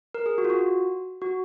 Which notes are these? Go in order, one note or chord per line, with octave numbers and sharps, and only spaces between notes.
A#4
G#4
F#4
F4
F#4
F#4